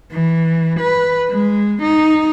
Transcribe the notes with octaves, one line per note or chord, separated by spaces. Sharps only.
E3
B4
G#3
D#4